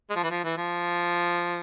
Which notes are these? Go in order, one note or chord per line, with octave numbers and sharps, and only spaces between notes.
G#3
F3
E3
F3
E3
F3